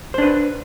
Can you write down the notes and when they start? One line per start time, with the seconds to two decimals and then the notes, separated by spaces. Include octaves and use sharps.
0.14 C5
0.18 D4
0.22 B4